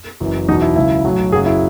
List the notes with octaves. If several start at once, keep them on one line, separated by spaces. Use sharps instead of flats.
F#1 F#2 E3
E2 B2 F#3 D#4
E4
C#2 C#3 F#3 E4
B1 A2 F#3
F#1 F#2 C#3 F#3 G#4
E4